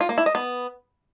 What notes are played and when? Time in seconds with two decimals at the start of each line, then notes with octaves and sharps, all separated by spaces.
0.01 F4
0.09 A#3
0.18 E4
0.26 D#5
0.35 B3